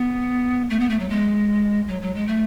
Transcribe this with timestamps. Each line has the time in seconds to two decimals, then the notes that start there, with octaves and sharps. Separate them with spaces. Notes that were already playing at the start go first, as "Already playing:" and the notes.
Already playing: B3
0.70 A3
0.79 B3
0.89 A3
0.99 F#3
1.09 G#3
1.88 F#3
2.01 F#3
2.14 G#3
2.27 A3